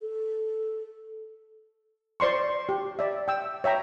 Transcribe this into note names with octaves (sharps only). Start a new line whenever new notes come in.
A4
C5 D5 C6 C#6
G4
D5 E5
G5 E6
C#5 E5 G5 A#5